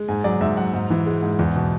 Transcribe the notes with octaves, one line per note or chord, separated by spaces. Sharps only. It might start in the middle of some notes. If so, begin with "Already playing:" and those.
Already playing: G#3
G#2 G#5
F#3 D5
G#2 E5
F#3 F#5
G#2
E3
G#3
G#2
E2
B2